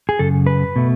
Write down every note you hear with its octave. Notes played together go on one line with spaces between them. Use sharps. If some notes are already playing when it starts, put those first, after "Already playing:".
G#4
F#2 C#3 A4
B4
B2 A3